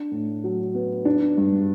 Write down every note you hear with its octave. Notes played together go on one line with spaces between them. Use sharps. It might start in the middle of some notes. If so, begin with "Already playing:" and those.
Already playing: D4
A2
F#3
B3
D4
G2